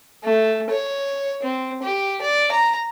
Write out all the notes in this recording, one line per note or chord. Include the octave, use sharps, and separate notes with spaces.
A3
C#5
C4
G4
D5
A#5